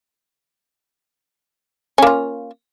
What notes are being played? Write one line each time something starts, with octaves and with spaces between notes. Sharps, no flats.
A#3 C#4 F4